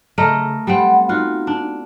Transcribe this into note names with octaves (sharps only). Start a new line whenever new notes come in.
C#3 A3 A#4 D#5
G3 B3 C4 F#5
D#4 F4 F#4
D4